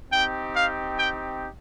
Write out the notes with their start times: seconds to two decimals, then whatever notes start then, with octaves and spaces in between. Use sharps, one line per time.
0.10 C4 D#4 G4 G5
0.54 F5
0.97 G5